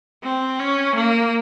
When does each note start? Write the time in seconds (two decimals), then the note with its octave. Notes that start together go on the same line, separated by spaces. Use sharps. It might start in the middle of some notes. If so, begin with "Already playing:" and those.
0.23 C4
0.59 C#4
0.95 A#3